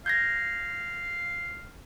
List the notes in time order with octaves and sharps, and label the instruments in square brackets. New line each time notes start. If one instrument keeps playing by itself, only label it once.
[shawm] F5 [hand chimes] G6 G#6 A#6